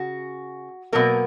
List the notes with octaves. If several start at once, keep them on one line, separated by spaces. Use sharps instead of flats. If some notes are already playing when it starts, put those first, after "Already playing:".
Already playing: C#3 F#4
B2 F#3 A#3 A#4